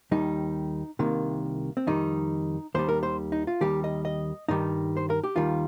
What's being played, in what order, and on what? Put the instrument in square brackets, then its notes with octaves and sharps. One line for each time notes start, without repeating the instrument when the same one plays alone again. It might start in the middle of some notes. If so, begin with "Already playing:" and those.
[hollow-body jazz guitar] D#2 D#3 G3 D#4
C2 C3 D#3 A#3
C4
F2 D#3 G3 D#4
D#2 D#3 G3 C5
A#4
C5
D#4
F4
D#2 D#3 G3 G4
D#5
D#5
G2 D#3 G3 D#4
C5
A#4
G4
D#2 D#3 G3 F4